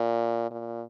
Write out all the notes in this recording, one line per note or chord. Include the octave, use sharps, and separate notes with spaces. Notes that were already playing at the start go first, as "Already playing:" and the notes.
Already playing: A#2
A#2